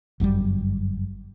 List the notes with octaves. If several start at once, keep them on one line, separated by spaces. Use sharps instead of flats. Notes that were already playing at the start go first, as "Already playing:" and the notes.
G1 F#2 C#3 G3